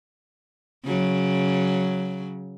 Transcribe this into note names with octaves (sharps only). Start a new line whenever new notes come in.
C#3 F#3